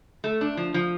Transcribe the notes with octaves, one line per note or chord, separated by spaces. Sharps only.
A3
D4
F3
F3